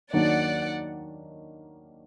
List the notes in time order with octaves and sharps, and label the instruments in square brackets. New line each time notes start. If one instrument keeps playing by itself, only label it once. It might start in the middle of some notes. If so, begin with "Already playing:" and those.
[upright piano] D#2 D#3 F#3 A#3 D4 [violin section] D5 F#5